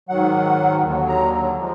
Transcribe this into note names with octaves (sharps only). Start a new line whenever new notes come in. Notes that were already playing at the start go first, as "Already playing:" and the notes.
G#2 D#3 F#3 F#5
D#2 D3 F#3
A#5
F3 G#3